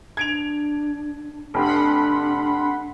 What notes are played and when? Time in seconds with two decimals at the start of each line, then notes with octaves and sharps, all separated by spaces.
0.17 D4 G#6 D7 F7
1.54 F1 D4 G4 F#5 B5 C6